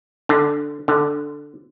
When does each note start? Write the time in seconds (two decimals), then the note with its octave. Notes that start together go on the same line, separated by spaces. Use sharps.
0.29 D3
0.88 D3